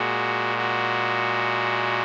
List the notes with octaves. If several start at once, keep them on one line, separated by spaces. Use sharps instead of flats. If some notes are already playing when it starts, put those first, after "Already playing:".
Already playing: A#2 G#3 F#4
F#4